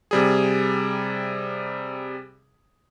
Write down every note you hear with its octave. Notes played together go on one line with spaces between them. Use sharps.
C3 G3 G#4